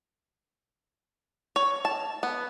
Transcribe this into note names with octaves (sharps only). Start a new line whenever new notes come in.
C#5
A5
B3